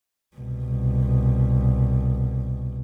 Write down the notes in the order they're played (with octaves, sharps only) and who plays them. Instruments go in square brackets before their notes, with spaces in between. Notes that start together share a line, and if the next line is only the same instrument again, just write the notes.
[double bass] C2 B2